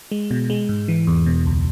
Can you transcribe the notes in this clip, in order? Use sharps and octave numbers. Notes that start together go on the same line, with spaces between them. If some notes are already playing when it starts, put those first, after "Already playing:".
G#3
B2
G#3
G#2
E3
E2
B2
C#2